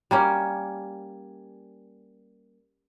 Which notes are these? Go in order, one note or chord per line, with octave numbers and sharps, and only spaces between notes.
G3 A#3 C#4